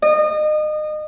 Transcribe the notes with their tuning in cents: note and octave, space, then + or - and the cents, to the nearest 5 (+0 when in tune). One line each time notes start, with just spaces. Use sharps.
D#5 -30